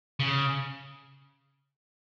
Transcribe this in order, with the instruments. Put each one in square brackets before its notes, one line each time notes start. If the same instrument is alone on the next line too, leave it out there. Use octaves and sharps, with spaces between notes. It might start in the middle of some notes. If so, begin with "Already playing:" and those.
[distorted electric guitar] C#3